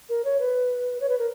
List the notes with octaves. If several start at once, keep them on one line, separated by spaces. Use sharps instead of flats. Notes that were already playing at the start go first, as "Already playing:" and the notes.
A#4
C#5
B4
C#5
B4
A#4